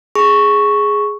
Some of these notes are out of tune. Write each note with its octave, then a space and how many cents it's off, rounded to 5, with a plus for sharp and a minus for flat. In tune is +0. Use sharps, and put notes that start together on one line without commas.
G#4 +0 C#6 +0